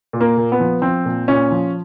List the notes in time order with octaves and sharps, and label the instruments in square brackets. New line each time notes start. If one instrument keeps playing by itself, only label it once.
[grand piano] A#2
A#3
A#2
B3
F3
F3 C4
A#2
A#2 C#4
F3